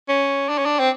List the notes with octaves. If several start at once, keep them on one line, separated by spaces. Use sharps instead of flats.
C#4
D4
C#4
D4
C4